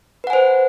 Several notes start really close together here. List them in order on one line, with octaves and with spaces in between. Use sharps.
B4 F#5 G#5 C5